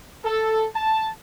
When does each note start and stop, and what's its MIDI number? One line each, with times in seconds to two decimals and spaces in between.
0.24 0.66 69
0.75 1.09 81